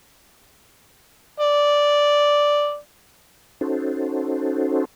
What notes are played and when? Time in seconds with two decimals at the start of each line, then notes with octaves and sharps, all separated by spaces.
1.40 D5
3.61 C#4 D#4 F#4 A4 C5